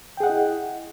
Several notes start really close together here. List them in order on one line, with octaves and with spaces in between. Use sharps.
G5 G#4 F#5 D#5 E4